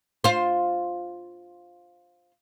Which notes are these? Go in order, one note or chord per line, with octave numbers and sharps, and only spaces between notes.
F4 C5